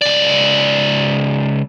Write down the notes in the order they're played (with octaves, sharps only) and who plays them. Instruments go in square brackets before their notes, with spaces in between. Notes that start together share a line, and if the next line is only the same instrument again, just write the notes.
[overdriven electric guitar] C#2 D5